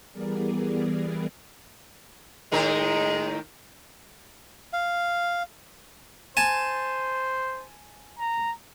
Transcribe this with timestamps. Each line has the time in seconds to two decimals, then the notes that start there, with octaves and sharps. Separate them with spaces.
0.12 E3 G3 B3 G#4 A#4 D5
2.52 A2 D#3 G#3 A#4
4.73 F5
6.37 C5 G#5 A5
8.19 A#5